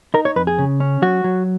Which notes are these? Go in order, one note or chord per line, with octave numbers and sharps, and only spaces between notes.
D#4 A#4
C#5
F2 B4
G#4
C#3
C#4
F#3 F#4
F#3